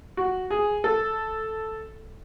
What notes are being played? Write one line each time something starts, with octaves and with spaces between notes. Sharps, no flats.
F#4
G#4
A4